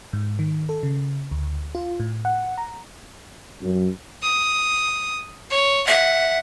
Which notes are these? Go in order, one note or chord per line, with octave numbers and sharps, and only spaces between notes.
G#2
D#3
A4
C#3
D2
F4
A2
F#5
A#5
F#2
D#6
C#5
E5 F#5